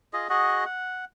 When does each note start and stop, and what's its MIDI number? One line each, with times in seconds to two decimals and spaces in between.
0.13 0.27 65
0.13 0.27 68
0.13 0.27 75
0.29 0.65 66
0.29 0.65 68
0.29 0.65 75
0.29 0.65 78
0.65 1.05 78